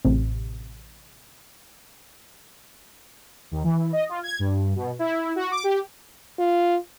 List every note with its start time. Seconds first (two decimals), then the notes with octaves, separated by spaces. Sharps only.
0.05 A1 C3
3.51 D#2
3.64 E3
3.93 D#5
4.09 F4
4.23 G#6
4.39 G2
4.76 B2
4.99 E4
5.36 F#4
5.51 D6
5.64 G4
6.39 F4